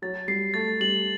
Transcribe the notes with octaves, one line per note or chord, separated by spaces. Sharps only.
F#3 A6
G3 C7
A3 A6
G3 F#7